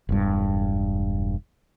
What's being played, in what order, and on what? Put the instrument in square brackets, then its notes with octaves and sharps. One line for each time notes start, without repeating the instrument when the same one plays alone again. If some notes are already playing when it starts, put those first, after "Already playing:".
[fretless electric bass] E1 G2